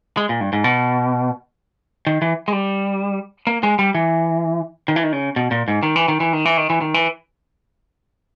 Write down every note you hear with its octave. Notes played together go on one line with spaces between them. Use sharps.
G#3
A#2
G2
G#2
B2
D#3
E3
G#3
G3
A#3
G#3
G3
E3
D#3
E3
D#3
C#3
B2
A#2
G#2
D#3
E3
D#3
E3
D#3
E3
D#3
E3
D#3
E3